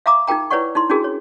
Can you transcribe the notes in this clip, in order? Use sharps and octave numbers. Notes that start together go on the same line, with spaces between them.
E5 F5 A#5 D6 D#6
D#4 F4 A#4 G5 A#5
E4 B4 C#5 D5 F#5 C#6
D#4 E4 C6
C#4 D4 E4 F#4 G#4 A#4
C#5